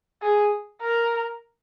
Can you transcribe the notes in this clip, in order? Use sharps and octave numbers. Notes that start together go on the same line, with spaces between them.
G#4
A#4